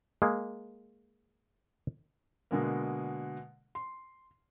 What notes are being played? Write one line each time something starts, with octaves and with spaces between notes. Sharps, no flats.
G#3 A#3
B2 D3 G#3 A#3
C6